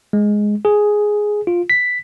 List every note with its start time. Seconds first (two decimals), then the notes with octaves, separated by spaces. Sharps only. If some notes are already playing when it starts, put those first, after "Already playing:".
0.13 G#3
0.65 G#4
1.47 F4
1.70 B6